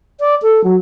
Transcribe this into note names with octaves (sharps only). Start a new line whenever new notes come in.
D5
A4
F#3